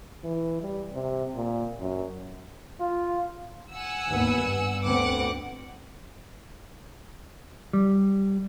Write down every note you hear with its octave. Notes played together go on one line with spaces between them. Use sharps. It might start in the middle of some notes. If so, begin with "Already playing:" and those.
E3
G3
C3
A#2
F#2
F4
F#5 G#5 E6
G#1 D#2 B3
G2
D2 B3 C4 F#5 D6
G3